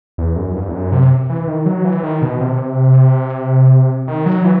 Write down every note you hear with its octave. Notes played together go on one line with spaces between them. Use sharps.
E2
F#2
G2
E2
F#2
C3
E3
D#3
F#3
E3
D#3
B2
C3
D#3
F#3
E3